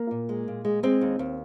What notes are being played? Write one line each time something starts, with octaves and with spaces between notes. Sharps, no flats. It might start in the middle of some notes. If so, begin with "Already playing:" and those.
Already playing: A#3
A#2
G#3
A#2
G#3
G#3 C4
D#2
D#2